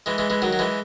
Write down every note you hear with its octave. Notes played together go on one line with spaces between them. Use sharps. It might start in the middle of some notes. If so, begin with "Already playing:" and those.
E3 G#3
E3 G#3
E3 G#3
D#3 F#3
F#3
E3 G#3